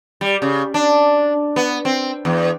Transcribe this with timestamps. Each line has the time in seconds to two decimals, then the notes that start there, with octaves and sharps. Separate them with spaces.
0.21 G3
0.42 C#3
0.74 D4
1.56 B3
1.85 C4
2.25 E2